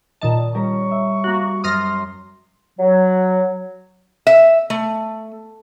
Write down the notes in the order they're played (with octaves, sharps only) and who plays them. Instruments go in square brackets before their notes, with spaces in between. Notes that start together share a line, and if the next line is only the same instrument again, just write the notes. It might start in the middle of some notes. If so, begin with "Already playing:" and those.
[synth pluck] A#2 D#3 A5 [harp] D#5
[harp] G3 C#4 A#4 [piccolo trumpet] C#6
[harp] E5
[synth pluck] A#3 F#4
[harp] F#2 C5 A6 [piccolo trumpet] C6 [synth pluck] D#6 F6 A#6
[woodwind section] F#3
[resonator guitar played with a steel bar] E5
A3